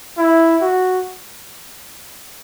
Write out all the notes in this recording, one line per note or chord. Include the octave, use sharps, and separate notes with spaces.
E4
F#4